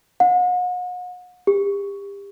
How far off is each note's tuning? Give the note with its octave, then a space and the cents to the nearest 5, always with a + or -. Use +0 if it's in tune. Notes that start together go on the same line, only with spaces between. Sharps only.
F#5 -40
G4 +30